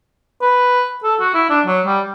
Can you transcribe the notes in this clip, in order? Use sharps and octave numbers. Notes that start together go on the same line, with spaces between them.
B4
A4
F#4
E4
D4
F#3
G3